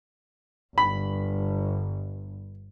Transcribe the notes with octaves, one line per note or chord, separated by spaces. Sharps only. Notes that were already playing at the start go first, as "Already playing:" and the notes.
G1 B5